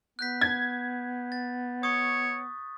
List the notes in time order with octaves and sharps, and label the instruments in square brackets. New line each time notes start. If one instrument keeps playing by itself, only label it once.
[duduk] B3 [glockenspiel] F#6 G6 B6
[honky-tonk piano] G#6
[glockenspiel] A6
[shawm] C#5 [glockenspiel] C#6 D#6